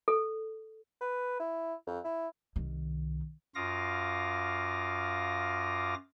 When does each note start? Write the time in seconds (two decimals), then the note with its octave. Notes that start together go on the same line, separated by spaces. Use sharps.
0.08 A4
1.01 B4
1.39 E4
1.87 F2
2.04 E4
2.56 C2 D#3
3.55 F#2 F4 F5 D6 D#6 A#6